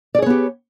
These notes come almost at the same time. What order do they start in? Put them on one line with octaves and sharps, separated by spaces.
D5 G#4 C#5 B3 G4